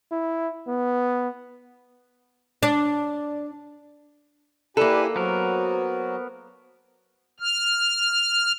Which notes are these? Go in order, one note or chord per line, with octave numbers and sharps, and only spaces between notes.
E4
B3
D4
A#3 E4 G4 A4 B4 D5 G#5
F#3 B3 F#4 A#4 C5
F6